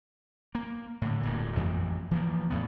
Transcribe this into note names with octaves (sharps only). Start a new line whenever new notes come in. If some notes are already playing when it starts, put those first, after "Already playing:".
A#3
A2 D3
D1 G2 A#2
A1 F2 E3 G#3
E3 F3 A#3
E2 A2 B3